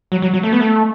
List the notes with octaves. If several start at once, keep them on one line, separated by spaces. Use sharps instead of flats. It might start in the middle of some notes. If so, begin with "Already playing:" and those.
F#3
F#3
F#3
A3
B3
A3